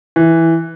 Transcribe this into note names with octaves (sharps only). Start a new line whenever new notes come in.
E3